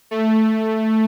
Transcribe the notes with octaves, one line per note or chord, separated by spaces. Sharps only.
A3